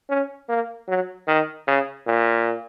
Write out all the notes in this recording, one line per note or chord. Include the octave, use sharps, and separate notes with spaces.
C#4
A#3
F#3
D#3
C#3
A#2